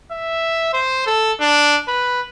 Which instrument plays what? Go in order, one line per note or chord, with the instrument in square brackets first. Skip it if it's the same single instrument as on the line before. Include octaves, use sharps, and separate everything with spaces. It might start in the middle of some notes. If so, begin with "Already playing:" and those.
[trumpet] E5
C5
A4
D4
B4